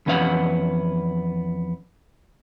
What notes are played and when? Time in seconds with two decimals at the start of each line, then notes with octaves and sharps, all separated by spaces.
0.06 F2 E3 B3 C#4 F5 F#5